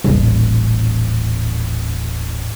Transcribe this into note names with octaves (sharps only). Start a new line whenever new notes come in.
D#1 A1